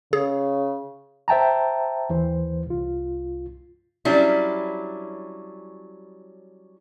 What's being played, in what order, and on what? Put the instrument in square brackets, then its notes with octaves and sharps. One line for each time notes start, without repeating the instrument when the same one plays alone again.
[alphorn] C#3 [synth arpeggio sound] G#4
[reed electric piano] C5 E5 G5 A5 A#5
D#2 E3 C5
C2 F4
[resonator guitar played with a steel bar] F#3 G3 C#4 D4 E4